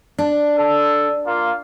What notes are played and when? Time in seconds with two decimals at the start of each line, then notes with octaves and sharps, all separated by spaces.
0.18 D4
0.55 A4
1.25 A#3 F4